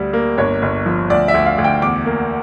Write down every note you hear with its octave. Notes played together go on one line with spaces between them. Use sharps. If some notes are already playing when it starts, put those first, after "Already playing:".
Already playing: D2 G3
A#3
G1 C#5
G1
F3
D2 D5
E5
D2
F5
D2
G5
E2 D6
A#3